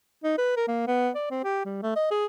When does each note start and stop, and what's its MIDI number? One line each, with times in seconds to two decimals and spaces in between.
0.24 0.34 63
0.38 0.55 71
0.57 0.65 70
0.68 0.83 58
0.87 1.10 59
1.15 1.28 74
1.30 1.43 60
1.44 1.63 67
1.65 1.82 55
1.83 1.95 57
1.96 2.09 75
2.11 2.26 68